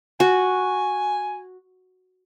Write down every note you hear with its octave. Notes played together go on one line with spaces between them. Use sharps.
F#4 G#5